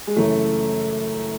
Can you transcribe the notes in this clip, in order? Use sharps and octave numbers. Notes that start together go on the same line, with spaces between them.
G#3
F#2 C#3 E3 A3